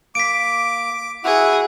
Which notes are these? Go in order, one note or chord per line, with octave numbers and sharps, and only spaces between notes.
A#3 D6 B6 D7
E4 F#4 G#4 F#5